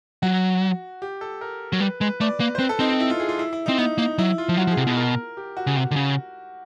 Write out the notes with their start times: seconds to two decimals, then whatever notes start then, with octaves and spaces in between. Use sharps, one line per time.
0.22 F#3 F#4
1.02 G4
1.21 A4
1.41 A#4
1.73 F#3
1.80 G3 B4
2.01 G#3 B4
2.20 A3 D5
2.40 A#3 B4
2.55 C5
2.59 C4 B4
2.69 A4
2.79 C4 D#4
2.89 D#4
3.00 E4
3.10 F4
3.20 G#4
3.29 F4
3.39 E4
3.53 E4
3.66 C4 D#4
3.78 B3 D#4
3.98 A#3 D#4
4.18 F#3 E4
4.38 F4
4.49 F3
4.57 F#3 F#4
4.67 F3
4.71 G#4
4.77 C3
4.85 B2 G#4
4.97 A#4
5.37 G4
5.57 F#4
5.67 C#3
5.77 C3
5.91 D3
5.96 C#3